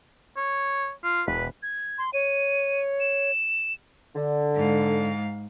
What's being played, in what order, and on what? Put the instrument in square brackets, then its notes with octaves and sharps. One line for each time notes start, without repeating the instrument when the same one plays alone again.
[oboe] C#5
F4
[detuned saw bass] E1 [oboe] B4
[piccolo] G#6
[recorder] C6
[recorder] C#5 [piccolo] D#7
[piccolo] E7
[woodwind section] D3
[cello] G#2 F5